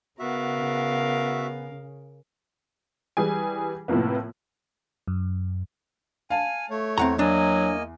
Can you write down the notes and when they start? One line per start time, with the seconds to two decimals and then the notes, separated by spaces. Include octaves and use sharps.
0.19 C#3 B3 F#4 A#4 E5 F5
3.17 E3 G3 G#4 G#5
3.88 A2 C3 F3 A#3 B3
5.08 F#2
6.30 F5 G#5 A5
6.70 A3 C#5
6.98 E2 C4 F#5 A#5
7.19 F#3 A#3 D4 D#5 G#5